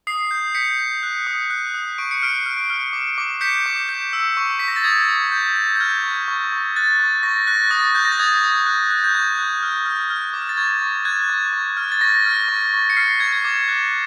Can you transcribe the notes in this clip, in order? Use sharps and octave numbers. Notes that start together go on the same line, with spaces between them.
D#6 C7
G6
G6 B6 C#7
G6
F#6
D#6
F#6
D#6
C#6 D7
C#7
F6 C7 D7
F6
F6
D6
D6
G6 B6 C#7
D6
G6
E6
C#6
C#6 B6
A#6
A6
D#6 G#6
D#6
G6
G6
G6
F6 G#6
C#6
C#6
C#6
F#6 A6
C#6
C#6 A#6
F#6 A#6
D#6 A6
F#6 G6
A#6
A6
D#6 G#6
D#6
F#6
F#6
G6
C#6 G#6
F#6
F6
F6
F6
D6
A6
C#6 G#6
C#6
F#6 G#6
C#6
C#6
F6
A6
C#6 A#6
F6
C#6
C#6
C#7
F6 C7
C#6 G#6
G#6
D6 G#6
F#6